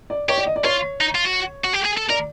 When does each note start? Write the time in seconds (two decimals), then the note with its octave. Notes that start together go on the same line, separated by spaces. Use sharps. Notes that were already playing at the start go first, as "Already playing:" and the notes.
0.10 D5
0.29 G4 C#5
0.38 D5
0.46 D#5
0.56 D5
0.64 F4 C#5
1.01 D#4
1.15 F4
1.25 F#4
1.64 F#4
1.73 G4
1.85 G#4
1.97 A4
2.09 A#4 D5